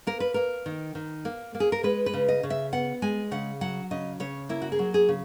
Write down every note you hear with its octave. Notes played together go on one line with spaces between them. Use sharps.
A#3 A#4
B4
A#3 A#4
D#3
D#3
A#3
A#3
G#4
A#4
G#3 B4
B4
C#3
D#5
C#3
E5
B3 F#5
G#3 G#5
C#3 F#5
F#3 F#5
C#3 D#5
C#3 C#5
A#3 E4
F#4
G#4
F#3
G#4
C#3